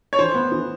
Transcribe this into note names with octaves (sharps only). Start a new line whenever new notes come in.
C#5
E3 C5
B3
E3